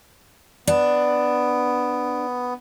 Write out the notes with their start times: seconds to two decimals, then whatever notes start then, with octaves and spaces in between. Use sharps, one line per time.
0.67 B3 D4